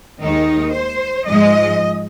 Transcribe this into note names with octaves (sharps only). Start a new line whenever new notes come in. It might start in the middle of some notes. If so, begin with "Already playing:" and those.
D#2 D#3 G#3 D#4
C5
G#2 F3 G#3 D#5